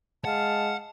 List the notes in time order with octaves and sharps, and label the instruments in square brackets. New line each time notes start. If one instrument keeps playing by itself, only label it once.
[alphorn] G#3 [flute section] F5 A5 [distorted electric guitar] F#5